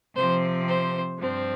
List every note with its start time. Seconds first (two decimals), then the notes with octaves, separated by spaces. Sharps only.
0.16 C3 F3 C4 C5
0.67 C5
1.19 G2 F3 C4